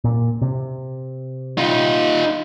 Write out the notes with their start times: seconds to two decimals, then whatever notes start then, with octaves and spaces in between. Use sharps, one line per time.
0.04 A#2
0.42 C3
1.58 D#4 F4